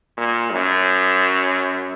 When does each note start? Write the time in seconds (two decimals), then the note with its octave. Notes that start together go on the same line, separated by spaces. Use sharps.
0.17 A#2
0.52 F#2